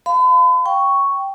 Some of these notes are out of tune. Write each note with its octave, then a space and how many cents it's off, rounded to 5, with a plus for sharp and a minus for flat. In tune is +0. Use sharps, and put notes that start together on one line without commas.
F5 +0 B5 +45
G5 +0 C#6 +0